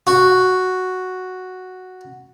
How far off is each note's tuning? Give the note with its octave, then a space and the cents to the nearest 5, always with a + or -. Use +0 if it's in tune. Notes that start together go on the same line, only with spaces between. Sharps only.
F#4 +0